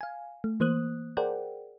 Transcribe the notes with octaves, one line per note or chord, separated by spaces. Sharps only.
F5 G#5
A3
E3 A#3 C5 D#6 F#6
G#4 A#4 C5 D5 F#5 G5